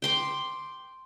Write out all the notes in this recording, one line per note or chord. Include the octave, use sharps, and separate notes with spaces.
G5 C6 D6